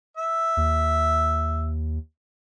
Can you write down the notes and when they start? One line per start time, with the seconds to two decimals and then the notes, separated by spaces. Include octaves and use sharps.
0.17 E5
0.57 D#2